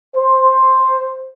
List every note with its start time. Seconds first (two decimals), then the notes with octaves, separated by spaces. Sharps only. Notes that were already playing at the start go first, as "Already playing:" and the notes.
0.16 C5